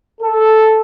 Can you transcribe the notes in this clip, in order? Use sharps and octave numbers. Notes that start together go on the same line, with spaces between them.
A4